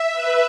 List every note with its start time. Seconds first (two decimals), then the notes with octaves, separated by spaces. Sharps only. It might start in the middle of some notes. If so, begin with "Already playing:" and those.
Already playing: E5
0.12 B4